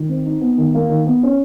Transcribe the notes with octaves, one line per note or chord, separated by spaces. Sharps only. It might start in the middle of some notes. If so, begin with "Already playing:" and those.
Already playing: D#3
C4
D#4
B3
D#3
A#3
D#3
B3
C#4